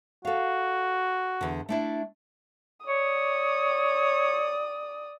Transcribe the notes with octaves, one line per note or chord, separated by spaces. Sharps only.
F#4 A4 F5
E2 D3
A3 D4 E4
C#5 D5 D#6